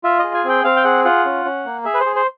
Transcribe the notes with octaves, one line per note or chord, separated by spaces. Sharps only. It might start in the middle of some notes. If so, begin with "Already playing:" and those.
F4 E5
G#4 D#5
G#5
C4 G5
C4 F5
G5
G#4 F#5
F4 F#5
C#4
C#4
A#3
G#4 E5
B4
C5
G#4
C5